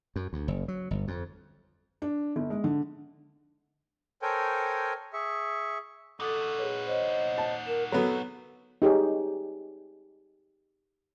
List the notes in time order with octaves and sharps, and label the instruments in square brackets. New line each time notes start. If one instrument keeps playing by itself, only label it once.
[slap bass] F#2
D2
F#1
F#3
G1
F2
[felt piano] D4
G1
G#3
D3
[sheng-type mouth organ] A4 A#4 C5 C#5 G5 G#5
G#4 E5 C#6
[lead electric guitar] D#4 F#4 [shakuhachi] A4 [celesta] D6 D#6 A6
[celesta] G#4 B4 C#5
[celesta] C5 C#5 [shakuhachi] D#5
[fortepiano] A5
[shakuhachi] A#4 [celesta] E7
[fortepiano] F#3 B3 [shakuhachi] A4
[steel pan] D#4 G4 G#4 C#5